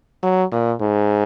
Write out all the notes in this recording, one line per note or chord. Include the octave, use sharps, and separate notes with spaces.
F#3
A#2
G#2